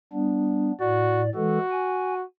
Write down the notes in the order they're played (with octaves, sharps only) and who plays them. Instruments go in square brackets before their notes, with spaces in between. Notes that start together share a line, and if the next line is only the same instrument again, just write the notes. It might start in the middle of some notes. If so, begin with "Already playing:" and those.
[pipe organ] G3 B3 D4
[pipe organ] A2 D5 [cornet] F#4
[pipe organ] E3 G#3 A4 [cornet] F#4
[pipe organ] G#5